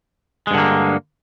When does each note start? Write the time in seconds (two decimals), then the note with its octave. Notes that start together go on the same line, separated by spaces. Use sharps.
0.47 G#3
0.51 G2
0.54 D3
0.58 A#3